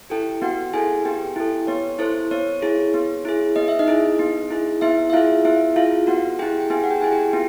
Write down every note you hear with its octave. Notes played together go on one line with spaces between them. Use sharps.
E4 G4 A4 G5
B3 F#4 F#5
E4 G#4 A4 G#5
B3 G4 G5
E4 A4
B3 C#5
E4 A4 C5
B3 C#5
E4 G#4
B3
E4 G#4
B3 D#5
E5
D#4 D#5
E4 G#4
B3
E4 G#4
B3 E4 E5
E5
E4 F4 G#4 F5
B3 E4 E5
E4 F4 G#4 F5
B3 F#4 F#5
E4 G4 G#4 G5
G5
B3 G#4 G#5
F#5
G4 G5
E4 G#4 G#5
G4 G5
B3 F4